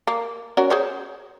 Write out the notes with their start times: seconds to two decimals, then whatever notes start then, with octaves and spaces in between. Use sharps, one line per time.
0.07 A#3
0.57 C#4 F#4 A#4
0.70 G#4 C5 C#5